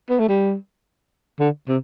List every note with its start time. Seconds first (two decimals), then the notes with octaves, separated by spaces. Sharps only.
0.10 B3
0.19 A3
0.29 G3
1.40 D3
1.68 C3